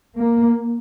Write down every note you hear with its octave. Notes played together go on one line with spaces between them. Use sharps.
A#3